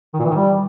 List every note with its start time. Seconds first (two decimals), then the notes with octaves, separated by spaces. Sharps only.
0.14 D#3
0.19 A#2
0.25 E3
0.30 D#3
0.35 G3